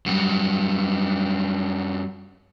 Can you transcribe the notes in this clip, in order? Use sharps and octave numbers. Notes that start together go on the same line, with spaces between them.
F#2 G3